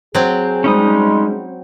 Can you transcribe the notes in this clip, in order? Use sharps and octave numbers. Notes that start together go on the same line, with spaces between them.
F#3 C4 G#4
F3 G3 G#3 C#4 D#4 D#6